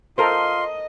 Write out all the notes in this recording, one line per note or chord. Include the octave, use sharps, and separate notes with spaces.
F4 A4 A#4 C5 D#5 C6